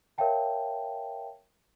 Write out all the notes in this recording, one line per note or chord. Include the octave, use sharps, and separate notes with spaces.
A#4 C#5 E5 F5 G5 A5